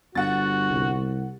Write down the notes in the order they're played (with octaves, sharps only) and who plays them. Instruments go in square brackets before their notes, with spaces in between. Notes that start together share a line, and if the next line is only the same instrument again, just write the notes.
[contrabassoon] G1 [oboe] F#4 [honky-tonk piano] F#5 A6
[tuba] C2